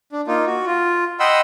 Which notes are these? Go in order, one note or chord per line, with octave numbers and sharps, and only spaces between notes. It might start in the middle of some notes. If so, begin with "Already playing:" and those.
D4
A#3 D#4 F4
F#4
F4
D#5 F#5 G5 B5 C6 E6